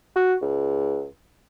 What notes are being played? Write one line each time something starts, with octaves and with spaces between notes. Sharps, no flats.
F#4
C#2